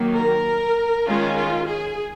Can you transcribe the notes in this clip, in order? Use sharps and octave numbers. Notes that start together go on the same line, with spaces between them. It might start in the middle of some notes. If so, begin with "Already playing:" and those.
Already playing: D#3 F#3 A#3
A#4
D#3 G#3 C#4 F4
F4
G#4